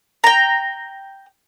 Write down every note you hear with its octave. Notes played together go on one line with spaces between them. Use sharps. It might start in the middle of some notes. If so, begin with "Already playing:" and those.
G5 A#5